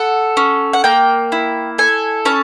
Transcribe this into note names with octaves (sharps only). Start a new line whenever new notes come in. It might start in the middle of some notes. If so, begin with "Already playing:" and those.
Already playing: A4 F#5
C#4
F#5
A#3 G5
E4
A4 G#5
C#4 A5